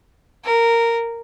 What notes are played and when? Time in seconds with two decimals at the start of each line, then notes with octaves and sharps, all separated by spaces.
0.45 A#4